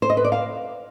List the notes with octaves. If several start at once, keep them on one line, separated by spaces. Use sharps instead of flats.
C5
D#5
B4
D5
F5